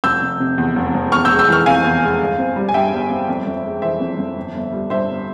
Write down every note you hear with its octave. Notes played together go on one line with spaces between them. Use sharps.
F1 E6 G6
F1
C3
E2
F1
F1
E2 C#6 F6
E6 G6
G#3
E6 G6
E3 C#6 F6
C3 F5 G#5
E2
G#3
G1
C4
G3
G#5
G2 E5 G5
G1
C4
F2
F2
G#3
E3 C5 E5
F2
F2
G1
G1
G3
G2 C5 E5
G1